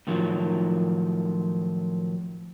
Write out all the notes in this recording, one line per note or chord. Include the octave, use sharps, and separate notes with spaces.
A2 D#3 F3 F#3